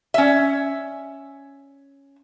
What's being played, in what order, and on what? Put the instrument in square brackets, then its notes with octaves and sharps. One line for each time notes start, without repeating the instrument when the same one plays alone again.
[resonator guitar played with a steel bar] C#4 E5